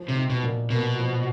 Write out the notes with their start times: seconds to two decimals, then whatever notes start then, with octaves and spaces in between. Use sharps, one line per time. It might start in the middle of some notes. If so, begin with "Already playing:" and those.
Already playing: F3
0.08 C3
0.16 D#4
0.30 B2
0.43 A#2
0.70 B2 A#3
0.98 F3